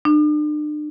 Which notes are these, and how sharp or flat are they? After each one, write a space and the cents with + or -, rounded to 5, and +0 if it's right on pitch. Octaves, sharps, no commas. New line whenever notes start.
D4 +40